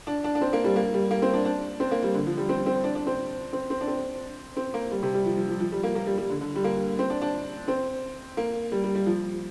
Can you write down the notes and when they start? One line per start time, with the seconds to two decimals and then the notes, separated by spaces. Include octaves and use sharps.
0.07 D4
0.24 D4
0.35 D4
0.41 C4
0.53 A#3
0.64 G3
0.76 A#3
0.94 G3
1.11 A#3
1.22 C4
1.33 D4
1.45 D4
1.80 C4
1.91 A#3
2.03 G3
2.14 D3
2.27 F3
2.37 G3
2.49 C4
2.66 C4
2.84 D4
2.95 D4
3.07 C4
3.53 C4
3.70 C4
3.81 D4
3.87 C4
4.57 C4
4.74 A#3
4.91 G3
5.03 C3
5.14 G3
5.26 F3
5.37 F3
5.49 F3
5.60 F3
5.72 G3
5.83 A#3
5.95 A#3
6.07 G3
6.18 G3
6.29 D3
6.41 D3
6.55 G3
6.64 A#3
6.99 C4
7.10 D4
7.22 D4
7.68 C4
8.37 A#3
8.72 G3
8.84 G3
8.95 G3
9.06 F3